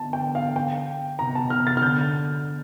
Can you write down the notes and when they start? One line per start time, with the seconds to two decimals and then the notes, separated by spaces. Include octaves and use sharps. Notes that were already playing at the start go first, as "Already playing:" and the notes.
Already playing: D3 A5
0.13 G5
0.35 F5
0.56 G5
1.19 C3 A#5
1.35 A5
1.50 C3 F6
1.67 A6
1.77 F6
1.82 D3 G6